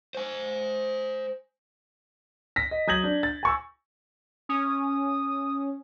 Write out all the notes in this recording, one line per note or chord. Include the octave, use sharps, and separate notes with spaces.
C5 G#5
A#6 B6
D#5
F#3 D#6 G6 G#6 A#6 F#7
D4
A6
G#5 C#6 E6
C#4 D#6